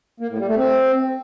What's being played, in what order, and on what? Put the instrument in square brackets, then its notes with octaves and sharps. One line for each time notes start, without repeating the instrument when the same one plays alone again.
[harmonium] A#3
A2
G3
A3
C4